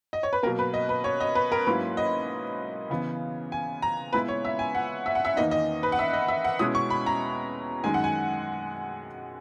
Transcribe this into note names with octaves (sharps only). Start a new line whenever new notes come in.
D#5
C#5
B4
B2 F#3 A#3 A#4
B4
D#5
B4
C#5
D#5
B4
A#4
G#2 F#3 A#3 C#4 E4 B4
D#5
C#3 E3 B3
G#5
A#5
A#2 G#3 B3 E4 B4
C#5
E5
G#5
F#5
E5
F#5
E5
E2 D#3 A#3 D#4 D#5
D#5
B4
F#5
E5
D#5
E5
F#5
B2 G#3 C#4 E4 D#6
C#6
B5
A#5
F#2 D#3 G#3 D#4 G#5
F#5
G#5